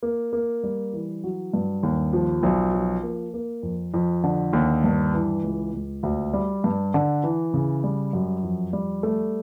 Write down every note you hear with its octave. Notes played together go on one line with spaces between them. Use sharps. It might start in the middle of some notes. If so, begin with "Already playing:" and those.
A#3
A#3
G3
E3
F#3
G2
D#2
F3
B1
F3
A#3
A#3
F2
F2
D3
D#2
G2
E3
C#2
C#2
D2
G3
G2
D3
E3
C#3
G3
F#2
F2
G3
A3